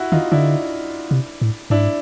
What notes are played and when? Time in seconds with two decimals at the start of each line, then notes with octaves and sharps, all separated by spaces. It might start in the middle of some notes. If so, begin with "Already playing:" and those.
Already playing: E4 F#4
0.12 D#3 D#4 F4
0.32 D3 D4 E4
1.11 C3
1.42 A2
1.70 G#2 D4 E4